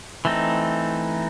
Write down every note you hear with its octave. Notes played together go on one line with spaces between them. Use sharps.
E3 A3 C4 D#4